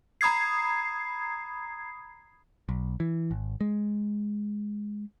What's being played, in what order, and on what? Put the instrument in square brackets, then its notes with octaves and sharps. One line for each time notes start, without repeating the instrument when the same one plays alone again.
[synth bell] A#5 B5 D#6 G#6 C7
[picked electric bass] B1
E3
G#1
G#3